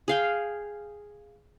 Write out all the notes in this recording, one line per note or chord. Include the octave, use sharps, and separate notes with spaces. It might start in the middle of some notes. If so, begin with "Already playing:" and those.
G#4 F5 G5